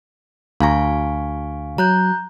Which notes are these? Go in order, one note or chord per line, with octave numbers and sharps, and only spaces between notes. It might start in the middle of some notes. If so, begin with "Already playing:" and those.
D2 F5 G#5 A#5 C#6
F#3 A#5 F#6 G6